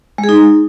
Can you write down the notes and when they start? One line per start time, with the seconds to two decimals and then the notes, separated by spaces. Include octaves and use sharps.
0.18 G#3
0.24 G#4
0.29 D#4